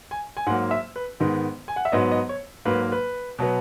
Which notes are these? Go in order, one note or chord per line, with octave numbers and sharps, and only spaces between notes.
G#5
G#5
G#2 F#3 A#3 F#5
E5
B4
G#2 D#3 G#3 B3
G#5
F#5
E5
G#2 F#3 B3 D#5
D#5
C#5
G#2 F#3 A#3 B4
B4
B2 F#3 B3